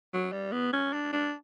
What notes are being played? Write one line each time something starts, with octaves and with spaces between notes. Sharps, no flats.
F#3
G3
B3
C#4
D4
D4